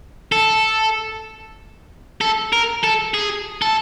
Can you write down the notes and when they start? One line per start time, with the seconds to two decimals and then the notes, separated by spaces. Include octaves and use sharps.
0.32 A4
2.21 A4
2.52 A#4
2.84 A4
3.14 G#4
3.62 A4